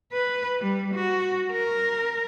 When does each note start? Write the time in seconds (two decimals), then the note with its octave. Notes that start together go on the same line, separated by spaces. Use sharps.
0.12 B4
0.60 G3
0.94 F#4
1.52 A#4